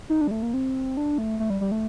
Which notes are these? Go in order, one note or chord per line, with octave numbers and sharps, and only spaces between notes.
D#4
D4
G3
A3
A#3
C4
D4
A3
A3
G3
G3
A3